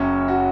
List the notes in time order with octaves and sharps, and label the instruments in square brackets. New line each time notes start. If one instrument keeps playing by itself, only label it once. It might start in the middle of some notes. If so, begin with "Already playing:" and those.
Already playing: [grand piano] F#1 F#2 F#3 C#4
F#4